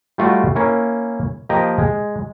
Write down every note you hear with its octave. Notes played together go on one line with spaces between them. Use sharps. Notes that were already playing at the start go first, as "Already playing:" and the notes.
G3 A3 F4 F#4 D5
A#3 C#4 E4
F3 A#3 G4 A#4 D#5
G#3